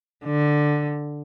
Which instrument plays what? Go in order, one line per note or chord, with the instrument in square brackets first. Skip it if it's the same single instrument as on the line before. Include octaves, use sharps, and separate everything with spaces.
[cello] D3